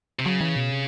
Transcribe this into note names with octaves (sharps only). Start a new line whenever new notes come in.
C3
C#3 F#3
E3
B2
C3